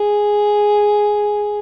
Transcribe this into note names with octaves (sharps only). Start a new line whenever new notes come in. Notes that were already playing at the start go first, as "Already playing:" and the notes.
Already playing: G#4